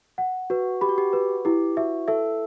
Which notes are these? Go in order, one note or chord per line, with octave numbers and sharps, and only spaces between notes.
F#5
F#4 B4
G4 B5
F#4
G4
F#4 B4
E4 G4
F#4 E5
A4 E5